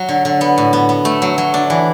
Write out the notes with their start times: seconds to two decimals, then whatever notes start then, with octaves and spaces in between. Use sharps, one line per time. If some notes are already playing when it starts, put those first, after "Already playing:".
Already playing: F#3
0.09 D3
0.25 D3
0.41 B3
0.58 A2
0.73 B3
0.89 B3
1.05 A3
1.22 F#3
1.38 F#3
1.54 D4
1.70 E3